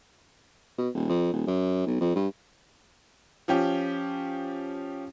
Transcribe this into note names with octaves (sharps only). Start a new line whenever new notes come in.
B2
D#1
F2
D#1
F#2
B1
F2
G2
F3 C#4 G4